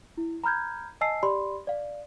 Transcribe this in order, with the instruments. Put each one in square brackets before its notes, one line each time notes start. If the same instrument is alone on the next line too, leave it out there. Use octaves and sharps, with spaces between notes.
[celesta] E4
A#5 B5 F6 G6 G#6
D#5 G#5 A5 E6 C7
G4 D5 B5 C6
D5 F5